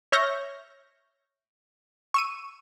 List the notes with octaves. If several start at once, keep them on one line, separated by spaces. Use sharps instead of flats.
C#5 E5 C#6 F6 G6 A#6
C#6 E6 D#7